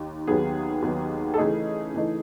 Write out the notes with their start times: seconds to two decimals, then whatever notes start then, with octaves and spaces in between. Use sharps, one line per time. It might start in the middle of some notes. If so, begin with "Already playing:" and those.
Already playing: D#2 D#3
0.27 D#2 D#3 F#3 B3 G#4
0.82 D#2 D#3 F#3 B3
1.34 A4
1.37 C#3 E3 A3 D#4 G#4
1.94 C#3 E3 A3 D#4